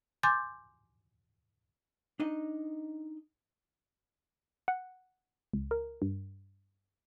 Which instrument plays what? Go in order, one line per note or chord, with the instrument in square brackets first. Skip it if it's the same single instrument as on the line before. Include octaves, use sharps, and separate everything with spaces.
[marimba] G#5 C6 D6 G6 A6
[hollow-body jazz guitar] D4 D#4 D#5
[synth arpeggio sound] F#5
C#2
A#4
G2